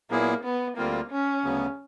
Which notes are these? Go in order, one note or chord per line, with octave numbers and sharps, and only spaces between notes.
A#2 F#3 A#3 B3 E4 G#4
B3
D2 D3 G3 A#3 C4 F4
C#4
D2 C#3 F#3 B3